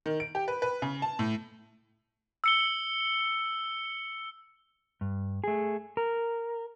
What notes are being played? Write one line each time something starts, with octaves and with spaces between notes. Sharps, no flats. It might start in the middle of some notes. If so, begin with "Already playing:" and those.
D#3
D7
G4
B4
B4
C#3
A5
A2
E6 C#7 G7
G2
A3 G#4
A#4